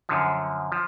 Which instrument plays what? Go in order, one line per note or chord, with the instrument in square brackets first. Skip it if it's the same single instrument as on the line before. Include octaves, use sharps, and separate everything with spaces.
[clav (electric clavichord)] F#2 D3 F3
F3